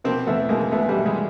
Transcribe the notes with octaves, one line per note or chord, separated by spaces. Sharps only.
B2 A#3 C4
E2 A3 B3
B2 G#3 A#3
B2 A3 B3
G3 A3
B2
G#3